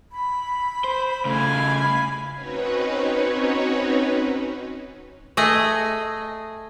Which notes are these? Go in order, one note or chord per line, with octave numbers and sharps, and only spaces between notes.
B5
C5
C#3 A3 F5 G#5
B5
C4 C#4 D#4 F#4 B4 C#5
A3 G#4 D#5 G#5